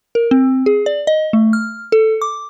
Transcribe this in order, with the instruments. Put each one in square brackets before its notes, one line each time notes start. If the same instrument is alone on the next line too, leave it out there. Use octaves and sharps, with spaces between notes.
[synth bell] A#4
C4
G#4
D5
D#5
A3
F6
A4
D6